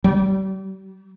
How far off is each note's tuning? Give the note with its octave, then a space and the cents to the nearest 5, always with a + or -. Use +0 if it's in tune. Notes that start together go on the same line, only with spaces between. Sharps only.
G3 -40